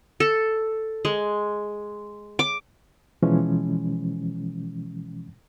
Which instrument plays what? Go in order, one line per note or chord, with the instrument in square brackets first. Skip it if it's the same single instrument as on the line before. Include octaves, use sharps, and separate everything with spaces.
[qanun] A4
G#3
D6
[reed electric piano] B2 E3 F3 G#3 C#4